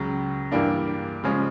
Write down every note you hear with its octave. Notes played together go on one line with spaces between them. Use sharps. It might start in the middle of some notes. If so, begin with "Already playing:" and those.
Already playing: C#2 C#3 F#3
G2 E3 G3 A#3 D4
C#3 F3 G#3 C#4